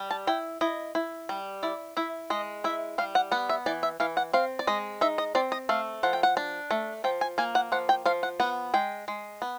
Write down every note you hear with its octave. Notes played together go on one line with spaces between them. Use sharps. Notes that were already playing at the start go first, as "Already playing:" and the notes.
Already playing: G3
A5
E4 G5
E4 D#5
E4
G3
E4 D5
E4 E5
G#3 D#5
E4 E5
G3 F5
F#5
B3 F#5
E5
E3 D5
E5
E3 F5
F#5
C4 F5
D5
G#3 D#5
D#4 E5
D#5
C4 D5
D#5
A3 F5
F3 F#5
G5
F#5
D4
A3
F3 G5
G#5
A#3 G#5
F#5
F3 F#5
G5
F3 F5
F#5
B3 F#5
G#3 G5
G#3
B3